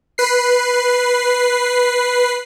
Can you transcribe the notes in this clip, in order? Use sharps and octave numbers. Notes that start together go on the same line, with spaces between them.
B4 C7